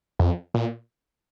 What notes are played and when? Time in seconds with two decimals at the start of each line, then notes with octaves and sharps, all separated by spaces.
0.19 F2
0.54 A#2